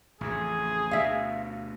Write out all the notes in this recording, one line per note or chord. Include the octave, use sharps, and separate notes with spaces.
A1 F2 C#3 G#4
D2 B2 E5 F5